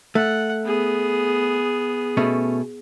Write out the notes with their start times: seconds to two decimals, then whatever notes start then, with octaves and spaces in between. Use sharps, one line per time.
0.15 A3 F#5
0.65 B3 G#4
2.17 B2 A3 C#4